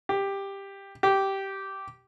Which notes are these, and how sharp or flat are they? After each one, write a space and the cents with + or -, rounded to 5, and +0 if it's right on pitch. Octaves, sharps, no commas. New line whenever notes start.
G4 +10
G4 -10